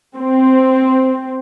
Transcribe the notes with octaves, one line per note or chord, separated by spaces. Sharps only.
C4